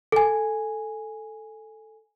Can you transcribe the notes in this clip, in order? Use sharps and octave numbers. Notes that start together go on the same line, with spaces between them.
A4 G#5